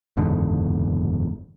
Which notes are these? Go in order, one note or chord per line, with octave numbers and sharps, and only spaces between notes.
F#1 E2 G#2 D3